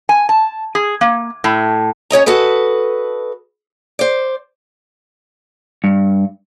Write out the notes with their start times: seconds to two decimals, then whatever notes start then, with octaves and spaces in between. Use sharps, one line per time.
0.09 G#5
0.29 A5
0.75 G#4
1.01 A#3
1.44 A2
2.10 C#4 C#5 D#5 A#5
2.26 F#4 A4 B4 D#5
3.99 C5 D5
5.84 G2